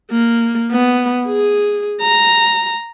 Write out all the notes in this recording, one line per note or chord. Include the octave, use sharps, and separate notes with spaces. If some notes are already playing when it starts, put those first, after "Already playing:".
A#3
B3
G#4
A#5